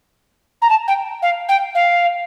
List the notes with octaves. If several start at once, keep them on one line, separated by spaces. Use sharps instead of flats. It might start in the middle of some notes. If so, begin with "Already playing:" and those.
A#5
A5
G5
F5
G5
F5